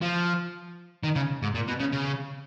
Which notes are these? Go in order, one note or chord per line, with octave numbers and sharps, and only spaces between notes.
F3
D#3
C#3
G#2
A#2
B2
C#3
C#3